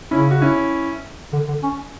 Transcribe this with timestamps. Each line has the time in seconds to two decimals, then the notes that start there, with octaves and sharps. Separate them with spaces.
0.11 C#3 C#4 E4
0.31 F#4
0.41 C#4 E4
1.33 D3
1.48 D3
1.63 C#4